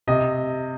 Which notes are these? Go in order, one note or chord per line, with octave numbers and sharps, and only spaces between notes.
C3 D#5